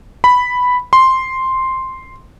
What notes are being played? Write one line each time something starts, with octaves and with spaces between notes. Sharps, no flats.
B5
C6